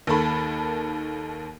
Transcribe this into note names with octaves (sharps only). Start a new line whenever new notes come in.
D#2 D#3 A4 B5